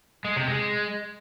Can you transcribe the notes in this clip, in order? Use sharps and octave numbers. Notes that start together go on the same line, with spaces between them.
G#3
C3
G#3